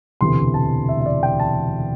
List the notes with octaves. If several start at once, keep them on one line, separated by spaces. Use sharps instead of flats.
E1 D2 C3 E3 C6
A5
E5
E5
D5
G5
A5